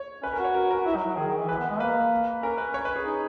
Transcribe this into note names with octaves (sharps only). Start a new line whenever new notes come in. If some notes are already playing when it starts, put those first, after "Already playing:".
Already playing: C#5
C#4 B4
A#4
F#4
C#5
A#4
A#4
F#4
E4
F#3
F#3
D#3 G#4
D#3
E3
E3 B4
B3
G#3
A#3 B4
C#4 A#4
B4
C#5
B4
G#4
D#4